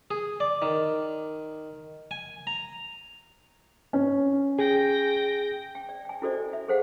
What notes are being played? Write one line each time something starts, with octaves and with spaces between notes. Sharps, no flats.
G#4
D5
D#3
G#5
A#5
C#4
G#4 G5 A#6
G5
D5
G5 G#5
E4 F#4 A4 C5 D5 D#5
E5
G#4 A4 C5 F5 F#5